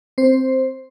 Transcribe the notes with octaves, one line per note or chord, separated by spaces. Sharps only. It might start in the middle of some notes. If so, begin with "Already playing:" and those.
C4 C5